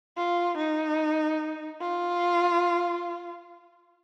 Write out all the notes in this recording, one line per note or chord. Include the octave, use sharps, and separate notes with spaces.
F4
D#4
F4